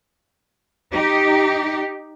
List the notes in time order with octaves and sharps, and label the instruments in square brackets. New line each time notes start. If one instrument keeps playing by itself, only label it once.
[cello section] D#4 G4